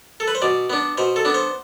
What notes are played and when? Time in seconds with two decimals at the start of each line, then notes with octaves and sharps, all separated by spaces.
0.20 A4
0.28 B4
0.35 C5
0.42 B2 D5
0.70 B3 D4
0.98 B2 C5
1.16 A4
1.25 B3 D4
1.34 C5